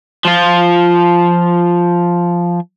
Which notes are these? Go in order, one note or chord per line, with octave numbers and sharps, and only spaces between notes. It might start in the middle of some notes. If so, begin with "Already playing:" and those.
F3 F4